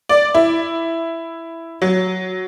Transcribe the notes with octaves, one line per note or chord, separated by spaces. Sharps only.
D5
E4
F#3